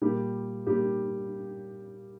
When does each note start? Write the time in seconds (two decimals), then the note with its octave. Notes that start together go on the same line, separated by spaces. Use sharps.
0.01 A#2 G3 A#3 G4
0.66 A#2 G3 A#3 G4